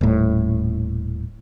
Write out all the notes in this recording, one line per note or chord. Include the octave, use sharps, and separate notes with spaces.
D#1 A2